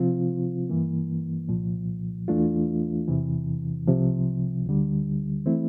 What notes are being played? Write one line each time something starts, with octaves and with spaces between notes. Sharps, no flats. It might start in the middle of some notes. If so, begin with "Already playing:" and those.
Already playing: C3 F3 C4 F4
G2 E3 A#3
C2 A#2 F3
E2 E3 A3 D4 F4
E2 C3 E3
C2 C3 F3
D2 D3 G3
E3 A3 C4 E4